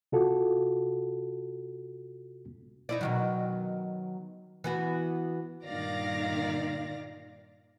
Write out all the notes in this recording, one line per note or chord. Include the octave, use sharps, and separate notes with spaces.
C3 F4 F#4 A4
D#4 E4 D5
B2 D#3 F#3
E3 B3 F#4
G2 A#2 D#3 D5 F5 A#6